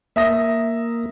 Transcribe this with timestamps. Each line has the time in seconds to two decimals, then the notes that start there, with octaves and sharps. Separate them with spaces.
0.16 A#3 E5 D#6 A#6